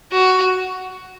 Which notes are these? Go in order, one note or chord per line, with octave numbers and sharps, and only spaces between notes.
F#4